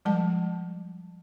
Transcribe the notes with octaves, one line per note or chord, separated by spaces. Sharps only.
F3 G3 G#3 A5